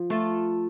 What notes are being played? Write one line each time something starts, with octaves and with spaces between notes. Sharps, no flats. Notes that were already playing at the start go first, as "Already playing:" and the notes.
Already playing: F3
A3 F4 A4